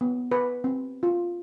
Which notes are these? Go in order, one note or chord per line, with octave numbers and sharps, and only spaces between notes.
B3
B4
C4
F4